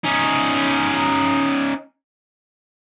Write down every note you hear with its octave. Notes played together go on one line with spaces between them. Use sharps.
C#4 D#4